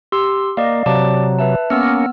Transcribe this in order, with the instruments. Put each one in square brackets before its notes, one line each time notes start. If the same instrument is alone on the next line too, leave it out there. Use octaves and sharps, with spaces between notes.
[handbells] G4 C6 E6
[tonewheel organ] A#3 [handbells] D5 D#5 F5
[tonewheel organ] C3 F#3 [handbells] D5 A5 D6
[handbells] B4 E5 A5
[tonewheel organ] A#3 C#4 [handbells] B3 E6 F6